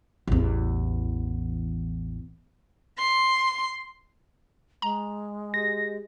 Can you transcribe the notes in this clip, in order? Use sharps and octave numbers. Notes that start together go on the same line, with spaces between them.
A1 E2
C6
G#3 A#5
G4 G#4 D#5 A#6